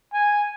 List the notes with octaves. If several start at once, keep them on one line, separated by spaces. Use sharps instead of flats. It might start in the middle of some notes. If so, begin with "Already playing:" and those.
G#5